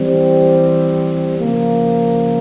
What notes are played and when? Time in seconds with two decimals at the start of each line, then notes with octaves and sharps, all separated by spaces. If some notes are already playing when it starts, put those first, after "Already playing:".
Already playing: E3 G3 C4
1.39 C#3 F3 A#3